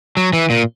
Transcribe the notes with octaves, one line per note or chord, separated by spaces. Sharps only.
F#3
E3
A#2